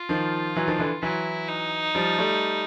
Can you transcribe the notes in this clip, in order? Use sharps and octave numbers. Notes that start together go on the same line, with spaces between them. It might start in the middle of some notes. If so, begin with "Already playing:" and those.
Already playing: F4
D#3 F3
E3 F#3
D#3 F3
D3 E3
E3 F#3 E4
D#4
F3 G3
G3 A3